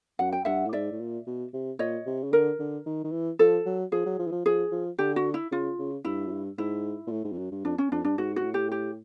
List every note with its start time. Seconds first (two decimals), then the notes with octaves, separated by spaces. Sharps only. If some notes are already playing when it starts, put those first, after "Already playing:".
0.19 F#2 F#5
0.33 G5
0.45 G2 E5 F#5
0.65 A2
0.73 G#2 D5 E5
0.92 A2
1.00 A#2
1.27 B2
1.53 C3
1.79 A#2 C#5 D#5
2.06 C3
2.23 C#3
2.32 D3 A#4
2.59 D3
2.86 D#3
3.04 D#3
3.12 E3
3.39 F3 A4
3.66 F#3
3.92 F3 G#4
4.06 F#3
4.19 F3
4.27 E3
4.31 F3
4.45 F3 G#4
4.72 F3
4.98 D3 G4
5.16 F#4
5.34 E4
5.51 C#3 F4
5.79 C#3
6.05 G2 E4
6.26 F#2
6.31 G2
6.58 G#2 E4
7.07 A#2
7.11 A2
7.24 G#2
7.32 F2
7.38 F#2
7.51 G2
7.65 F2 D4
7.78 C#4
7.92 F2 D4
8.04 G2 D4
8.18 G#2 F#4
8.36 G#2 F#4
8.44 A2
8.54 G4
8.72 G4